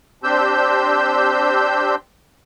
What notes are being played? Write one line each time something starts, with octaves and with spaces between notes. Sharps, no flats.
C4 D4 G4 C5 E6 G6